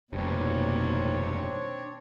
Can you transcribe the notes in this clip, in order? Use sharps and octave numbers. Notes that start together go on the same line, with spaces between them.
F1 G2 B2 D#3 A#3 C4 D4 C#5